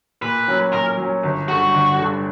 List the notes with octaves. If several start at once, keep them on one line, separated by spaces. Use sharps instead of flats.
A#2 B4
F#3 C#4
A#2 A#4
F#3 C#4
G1
G2 D3 F#4
G1
D3
G2